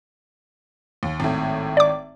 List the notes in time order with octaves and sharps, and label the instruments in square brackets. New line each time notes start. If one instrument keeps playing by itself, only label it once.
[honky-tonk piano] D#2
G#1 A2
[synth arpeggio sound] D5 D6